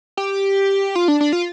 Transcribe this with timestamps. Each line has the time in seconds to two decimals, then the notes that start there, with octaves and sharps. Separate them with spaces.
0.17 G4
0.95 F4
1.08 D4
1.21 D4
1.33 F4